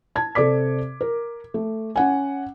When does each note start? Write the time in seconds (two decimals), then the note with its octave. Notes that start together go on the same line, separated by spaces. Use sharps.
0.16 A5 G#6
0.35 C3 A4 D5 D6 B6
1.01 A#4
1.54 A3
1.96 C#4 F#5 G#5